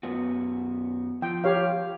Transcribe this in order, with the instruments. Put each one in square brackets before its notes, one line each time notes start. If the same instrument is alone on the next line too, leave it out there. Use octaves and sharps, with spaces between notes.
[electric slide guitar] F#2 B3 F#4
[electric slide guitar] F3 [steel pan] G5
[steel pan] G4 C#5 F5